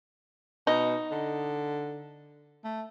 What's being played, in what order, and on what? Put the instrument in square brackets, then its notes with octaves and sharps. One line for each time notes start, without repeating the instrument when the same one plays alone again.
[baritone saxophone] B2 [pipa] D#4
[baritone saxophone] D3
A3